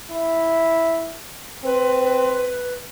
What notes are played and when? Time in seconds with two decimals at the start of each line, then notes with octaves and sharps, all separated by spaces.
0.11 E4
1.64 C4 B4